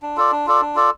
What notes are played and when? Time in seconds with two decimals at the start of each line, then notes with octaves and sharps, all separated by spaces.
0.02 D4
0.17 F4 A4 D5
0.32 D4
0.47 F4 A4 D5
0.61 D4
0.75 F4 A4 D5